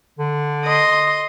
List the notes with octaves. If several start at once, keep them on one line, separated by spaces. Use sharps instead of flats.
D3
D#5 C6